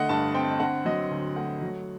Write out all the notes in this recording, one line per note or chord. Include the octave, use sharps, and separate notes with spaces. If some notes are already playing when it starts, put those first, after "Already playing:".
Already playing: D3 A3 D#5 F#5
G2 A5
C4 G5
D3 F#5
F#3 D#5
D2
A3 F#5
F#3